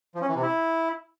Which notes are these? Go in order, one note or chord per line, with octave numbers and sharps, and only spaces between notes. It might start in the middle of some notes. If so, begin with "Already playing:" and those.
F3
C#4
E3
C3
E4